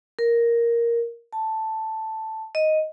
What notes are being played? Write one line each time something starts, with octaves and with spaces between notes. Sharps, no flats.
A#4
A5
D#5